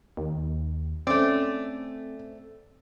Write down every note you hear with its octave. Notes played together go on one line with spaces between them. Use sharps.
D#2
A3 C4 C#4 D5